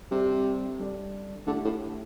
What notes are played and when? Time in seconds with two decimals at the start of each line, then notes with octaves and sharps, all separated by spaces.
0.11 C3 G3 D4 A4 D5
0.80 G3 D4 A4 D5
1.47 D3 A3 E4 G4
1.65 A2